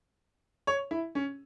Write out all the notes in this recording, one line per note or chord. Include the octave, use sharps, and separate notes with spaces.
C#5
E4
C#4